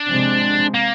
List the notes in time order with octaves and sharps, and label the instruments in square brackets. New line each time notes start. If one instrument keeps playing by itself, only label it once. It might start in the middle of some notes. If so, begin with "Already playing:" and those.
Already playing: [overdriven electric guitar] D4
[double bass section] C3 F3 G#3 C4
[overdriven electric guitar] A#3